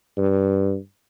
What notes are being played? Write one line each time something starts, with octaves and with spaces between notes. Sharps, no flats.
G2